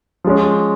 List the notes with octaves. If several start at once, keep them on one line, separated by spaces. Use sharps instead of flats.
F3 G#3 C#4